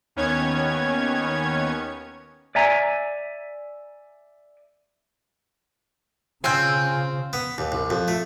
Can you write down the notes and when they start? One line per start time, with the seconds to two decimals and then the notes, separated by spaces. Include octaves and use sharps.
0.16 D#2 D#3 B3 C#4 C#5 G#6
2.55 D5 E5 G#5 A#5
6.44 C#3 C4 F4 G#5 E6 G6
7.33 B3
7.58 D#2
7.72 C2
7.90 F2
8.08 A3